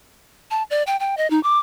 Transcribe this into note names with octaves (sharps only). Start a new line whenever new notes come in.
A5
D5
G5
G5
D#5
D#4
D6